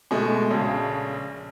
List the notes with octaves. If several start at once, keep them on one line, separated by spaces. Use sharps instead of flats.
B2 G#3 A3
A#1 C#3